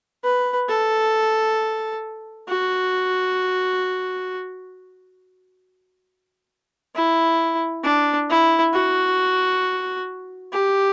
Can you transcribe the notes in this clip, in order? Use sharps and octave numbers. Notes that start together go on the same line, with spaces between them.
B4
A4
F#4
E4
D4
E4
F#4
G4